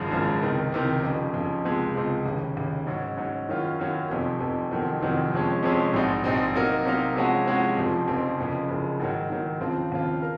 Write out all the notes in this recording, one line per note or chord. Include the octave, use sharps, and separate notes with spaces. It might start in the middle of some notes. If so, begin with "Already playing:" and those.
Already playing: G#1 F#2 C#3 F3 G#3
G#1 F#2 C#3 F3 G#3
C#2 C3 D#3
C#2 C3 D#3
F1 F2 C#3
F1 F2 C#3
C#2 C3 F3 G#3
C#2 C3 F3 G#3
F1 D#2 C#3
F1 D#2 C#3
G#2 F#3 C#4
G#2 F#3 C#4
F#2 D#3 F#3 C#4 F4
F#2 D#3 F#3 C#4 F4
F1 F2 C3
F1 F2 C3
F1 F2 C3 D#3 F#3
F1 F2 C3 D#3 F#3
F2 C3 F3 G#3 C#4
F2 C3 F3 G#3 C#4
A#1 G#2 F#3 C4 D#4
A#1 G#2 F#3 C4 D#4
C3 F#3 A#3 D#4 A#4
C3 F#3 A#3 D#4 A#4
C3 F3 G#3 C#4 F#4
C3 F3 G#3 C#4 F#4
F1 F2 C#3 F3 C4
F1 F2 C#3 F3 C4
F#1 F2 C#3
F#1 F2 C#3
G#2 D#3 F#3
G#2 D#3 F#3
D#2 C#3 F3 C4 F4
D#2 C#3 F3 C4 F4
A#4